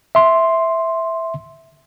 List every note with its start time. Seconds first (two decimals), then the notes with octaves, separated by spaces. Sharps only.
0.15 E5 C6